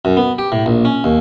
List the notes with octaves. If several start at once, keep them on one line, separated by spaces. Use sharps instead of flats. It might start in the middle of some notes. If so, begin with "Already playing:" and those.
F#2
B3
G4
A2
A#1
C#4
D#2